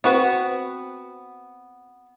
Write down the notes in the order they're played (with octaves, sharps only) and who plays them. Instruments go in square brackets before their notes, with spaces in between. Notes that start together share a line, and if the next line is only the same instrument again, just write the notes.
[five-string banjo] B3 F#4 B4 [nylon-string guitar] C4